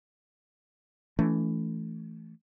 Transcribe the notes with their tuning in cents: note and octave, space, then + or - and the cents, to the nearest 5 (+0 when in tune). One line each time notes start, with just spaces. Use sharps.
E3 +10 A3 +0 C#4 +45